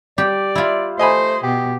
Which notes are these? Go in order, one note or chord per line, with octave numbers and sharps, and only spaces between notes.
G3 G4 D5
E4 F4
A3 C5 D#5 G#5 B5
B2 G4